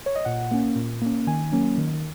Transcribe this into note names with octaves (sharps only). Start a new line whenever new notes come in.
C#5
D#5
A#2 F#5
A#3 C#4
A#2
A#3 C#4
D#3 G#5
F#3 A#3 C#4
D#3